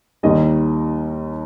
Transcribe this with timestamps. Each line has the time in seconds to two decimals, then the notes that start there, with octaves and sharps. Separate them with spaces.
0.23 D#2 D#3 G3 D#5